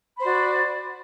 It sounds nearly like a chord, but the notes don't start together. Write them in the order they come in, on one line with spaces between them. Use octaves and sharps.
B5 C5 F#4 D5